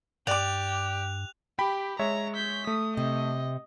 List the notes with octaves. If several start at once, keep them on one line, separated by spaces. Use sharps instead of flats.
G2 G4 D5 D6 F#6 F7
G4 G5 B5 B6
G#3 C#5 E5 A#5
G6 B6
A3 D#6
C3 D#5